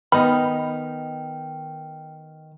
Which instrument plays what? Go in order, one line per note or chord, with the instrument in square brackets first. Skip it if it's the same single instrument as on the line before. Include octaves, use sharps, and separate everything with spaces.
[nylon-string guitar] D#3 B3 D#5 [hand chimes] G5 F6 [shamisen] B5